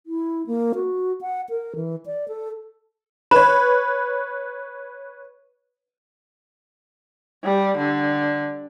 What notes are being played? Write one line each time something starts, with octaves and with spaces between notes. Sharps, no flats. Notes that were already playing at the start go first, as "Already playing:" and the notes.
E4
A#3
F#4
F#5
A#4
E3
D5
A4
B4 C#5 B5
G3
D3